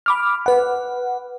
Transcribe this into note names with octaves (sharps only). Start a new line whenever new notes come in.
B5 D6 F6
B4 F#5